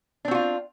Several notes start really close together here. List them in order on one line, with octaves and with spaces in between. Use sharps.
D4 C4 F#4 F4